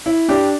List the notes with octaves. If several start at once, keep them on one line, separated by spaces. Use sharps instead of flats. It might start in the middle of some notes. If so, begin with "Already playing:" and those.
E4
D4 G4